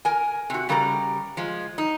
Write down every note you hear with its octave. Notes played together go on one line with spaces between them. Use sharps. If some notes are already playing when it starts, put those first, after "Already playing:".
A#4 G#5
C3 F#4
C#3 G3 A#4 A#5
F3 G#3
D#4